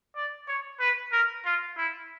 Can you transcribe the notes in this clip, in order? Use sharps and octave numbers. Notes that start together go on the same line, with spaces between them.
D5
C#5
B4
A#4
F4
E4